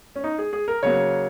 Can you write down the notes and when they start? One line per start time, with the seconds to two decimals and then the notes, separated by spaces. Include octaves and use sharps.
0.16 C#4
0.24 D#4
0.39 G#4
0.53 G#4
0.68 A#4
0.83 C#3 F#3 A#3 C#5